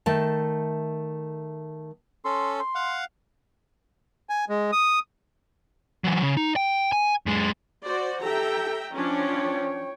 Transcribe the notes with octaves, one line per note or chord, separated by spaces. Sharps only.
D#3 A3 A5
C#4 A4 C6
C6
F5 F#5
G#5
G#3
D#6
E3 F#3
C#3
D#4
G5
G#5
F#2 G#3
F#4 C5 D5
G4 A4 E5 G5 A#5
F3 C#4 D4 C#5 G5